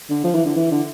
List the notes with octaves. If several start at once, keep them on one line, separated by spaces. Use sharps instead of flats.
D3
F3
E3
D3
E3
D3